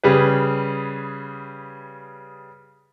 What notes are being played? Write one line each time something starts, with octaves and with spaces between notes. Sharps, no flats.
C#3 G3 G#4 B4